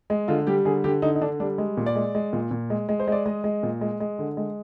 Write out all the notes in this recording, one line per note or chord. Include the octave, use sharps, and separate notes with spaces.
G#3
D3 F4
G3 G4
D3 G#4
D3 G4
D3 D#4
D#4
D3 D4
G3 D4
G#3
A#2
D5
G#3
G#3
A#2
A#2
G#3
G#3
C5
G#3 D5
G#3 D#5
G#3
A#2
G#3
G#3
D3
G#3